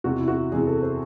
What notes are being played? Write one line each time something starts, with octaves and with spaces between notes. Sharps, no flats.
E2 C3 E3 F#4
E4
F#4
E2 C3 E3 G#4
A4
C5